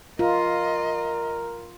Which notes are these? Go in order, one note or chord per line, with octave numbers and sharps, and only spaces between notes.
F4 A#4 D#5